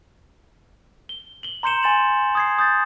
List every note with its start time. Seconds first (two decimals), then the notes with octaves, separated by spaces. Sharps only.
1.09 G7
1.43 F#7 G7
1.63 A#5 C6 G6 C#7 E7 G7
1.83 G#5 C6 A6 E7 F#7
2.35 D#6 G#6 C7
2.58 D#6 G6 A6